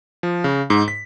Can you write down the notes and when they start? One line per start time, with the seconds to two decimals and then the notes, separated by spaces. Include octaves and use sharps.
0.23 F3
0.44 C#3
0.70 G#2
0.88 B6